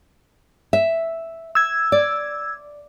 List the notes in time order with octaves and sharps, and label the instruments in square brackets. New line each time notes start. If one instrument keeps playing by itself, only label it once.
[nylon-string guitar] E5
[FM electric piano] E6 G#6
[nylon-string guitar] D5